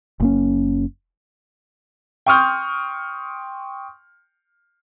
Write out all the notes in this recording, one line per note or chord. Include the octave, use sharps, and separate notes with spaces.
F#1 A#3 C#4
G5 C6 C#6 D#6 F6 G6